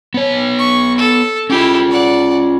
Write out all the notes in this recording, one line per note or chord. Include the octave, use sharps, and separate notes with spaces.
B3 C#5
C#6
A4
C#4 E4 F4 G4
D5 F#5